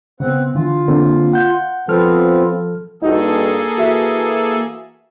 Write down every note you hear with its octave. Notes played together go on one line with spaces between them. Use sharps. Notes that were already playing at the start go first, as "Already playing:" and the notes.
C#3 B3 C4 F#5
D3 E3 F4
D3 A#3 C4
F#5 G6
F3 B3 C4 F4 A4 F6
G2 A#3 D#4 F#4 G#4 A4
E3 F#4 E5